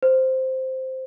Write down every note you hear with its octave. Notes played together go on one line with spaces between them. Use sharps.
C5